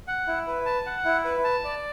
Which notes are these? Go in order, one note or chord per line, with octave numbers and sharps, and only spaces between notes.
F#5
E4
B4
A5
F#5
E4
B4
A5
D5